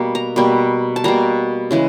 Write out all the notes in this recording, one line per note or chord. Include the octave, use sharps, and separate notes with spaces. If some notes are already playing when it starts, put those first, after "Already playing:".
Already playing: B2 G3 A#3
A#5
B2 G3 A#3
A5
B2 G3 A#3 A#5
C#3 E3 G#3